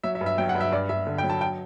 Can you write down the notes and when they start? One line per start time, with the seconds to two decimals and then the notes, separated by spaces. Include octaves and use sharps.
0.04 F#3 E5
0.15 E5
0.21 G2
0.26 E5
0.38 F#3 G5
0.49 F#5
0.55 G2
0.60 E5
0.72 G2 D5
0.89 G2 E5
1.07 D3
1.18 G5
1.24 F#3
1.30 A5
1.41 G5